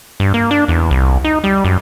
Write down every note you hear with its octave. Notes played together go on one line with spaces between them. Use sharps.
G2
A#3
D4
E2
C2
D#4
G3
F#2